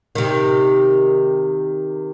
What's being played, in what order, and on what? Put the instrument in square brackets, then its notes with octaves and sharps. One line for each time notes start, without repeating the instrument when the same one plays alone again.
[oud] C3 D#3